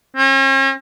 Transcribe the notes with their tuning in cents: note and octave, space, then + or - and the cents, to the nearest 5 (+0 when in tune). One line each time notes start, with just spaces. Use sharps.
C#4 -45